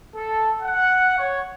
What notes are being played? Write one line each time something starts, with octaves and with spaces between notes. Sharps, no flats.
A4
F#5
C#5